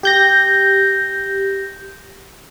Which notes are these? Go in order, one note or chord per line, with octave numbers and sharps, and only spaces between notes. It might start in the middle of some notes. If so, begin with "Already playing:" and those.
G4 G6 A#6